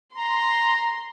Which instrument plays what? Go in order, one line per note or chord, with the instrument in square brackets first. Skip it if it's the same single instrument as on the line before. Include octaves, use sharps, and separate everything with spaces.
[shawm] A#5 [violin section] C6